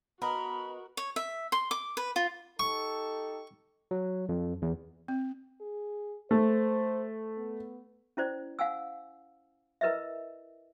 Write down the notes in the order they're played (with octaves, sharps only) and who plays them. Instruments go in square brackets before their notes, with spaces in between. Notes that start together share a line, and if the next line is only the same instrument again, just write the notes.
[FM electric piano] B3 B4 D#5 [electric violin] F#4 [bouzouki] A#4 [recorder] B5
[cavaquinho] C#5
E5
C6
D6
B4
F4
[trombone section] D#4 G4 A4 [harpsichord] C#6
[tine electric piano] F#3
F2
E2
[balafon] C4
[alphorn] G#4
[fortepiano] A3 [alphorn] C5
[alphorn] B3
[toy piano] C#4 E4 C5 D5
F5 F#5 G#5 E6
E4 A#4 B4 D#5 E5